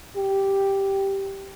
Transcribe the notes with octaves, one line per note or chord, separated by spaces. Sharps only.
G4